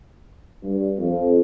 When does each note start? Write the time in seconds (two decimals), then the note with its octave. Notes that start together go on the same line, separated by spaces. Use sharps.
0.63 G2
0.98 F2